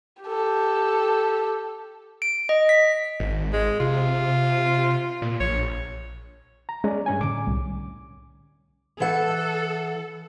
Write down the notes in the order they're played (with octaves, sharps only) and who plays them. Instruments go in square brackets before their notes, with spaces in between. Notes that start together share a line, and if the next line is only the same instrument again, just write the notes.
[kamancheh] G4 A4
[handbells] D7
D#5
B6
[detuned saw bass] G#1
[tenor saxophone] G#3
[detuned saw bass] C3 [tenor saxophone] F4
[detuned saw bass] A#2
[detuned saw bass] A#1 [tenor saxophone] C#5
[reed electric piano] A#5
[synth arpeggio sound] G#3 [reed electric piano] C#4 D5
[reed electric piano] G2 C#4 G#5
[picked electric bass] A2 D3 C#4 [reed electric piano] D6
[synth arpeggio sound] C2
[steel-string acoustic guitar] E3 F#5 [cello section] A4